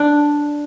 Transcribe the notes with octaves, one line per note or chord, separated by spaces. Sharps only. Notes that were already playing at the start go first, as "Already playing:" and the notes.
Already playing: D4